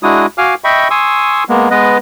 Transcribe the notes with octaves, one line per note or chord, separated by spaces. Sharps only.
G#3 D4 E4 F#4 D#6
F#4 F5 G#5 D6 F6
D#5 E5 G5 B5 C#6
G#5 C6 C#6 D#6 E6
G#3 A#3 B3
G#3 B3 B4 D#5